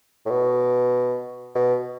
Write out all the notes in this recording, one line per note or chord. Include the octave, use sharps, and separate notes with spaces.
A2
B2
B2